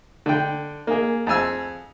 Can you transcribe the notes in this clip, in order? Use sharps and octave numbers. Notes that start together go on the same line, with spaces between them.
D3 G5
A#3 G#4
F2 G#4 G#5 E6